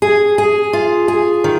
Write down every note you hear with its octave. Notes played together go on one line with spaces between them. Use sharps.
G#4
G#4
F4
G#4
D#3